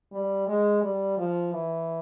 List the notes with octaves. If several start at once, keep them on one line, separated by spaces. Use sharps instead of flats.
G3
G#3
G3
F3
E3